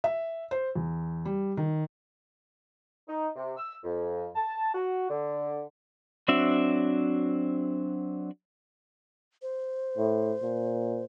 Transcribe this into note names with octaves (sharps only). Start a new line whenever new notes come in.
E5
C5
E2
G3
D#3
D#4
C3
E6
F2
A5
F#4
D3
F#3 C4 D4 F#4 E5
C5
A2
A#2